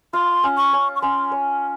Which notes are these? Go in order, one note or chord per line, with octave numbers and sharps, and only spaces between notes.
F4 C6
C#4
C#6
C#4
C#6
C#4 C6
C#5